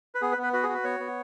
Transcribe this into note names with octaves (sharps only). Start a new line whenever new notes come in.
B4
B3 G#4
B4
B3
B4
F#4 B4
G#4
F#4
B4
B3 C#5
B3